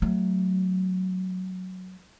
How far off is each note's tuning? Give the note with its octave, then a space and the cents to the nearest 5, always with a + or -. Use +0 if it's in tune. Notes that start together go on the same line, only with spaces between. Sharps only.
F#3 +0 A3 +0